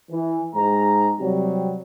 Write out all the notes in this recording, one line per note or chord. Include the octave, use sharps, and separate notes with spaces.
E3
G#2 A#5
C3 F#3 G3